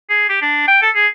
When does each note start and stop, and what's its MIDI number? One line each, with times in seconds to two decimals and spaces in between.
0.10 0.26 68
0.29 0.38 67
0.42 0.65 62
0.68 0.78 79
0.82 0.90 69
0.95 1.07 68